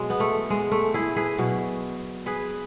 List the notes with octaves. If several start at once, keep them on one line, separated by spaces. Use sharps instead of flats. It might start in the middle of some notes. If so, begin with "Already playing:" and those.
Already playing: B2 F#3 G#3
B3
A3
G#3
A3
E4 G#4
G#4 B4
B2 F#3
G#4 B4